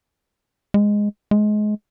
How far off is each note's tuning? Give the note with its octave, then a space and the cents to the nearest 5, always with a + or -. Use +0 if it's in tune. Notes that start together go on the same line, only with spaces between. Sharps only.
G#3 -5
G#3 +25